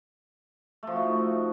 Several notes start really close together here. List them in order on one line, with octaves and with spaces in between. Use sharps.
A3 F3 F#4 D#4